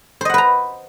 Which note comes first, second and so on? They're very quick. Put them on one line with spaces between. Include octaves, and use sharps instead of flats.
C5 D#5 F#5 B4 A#5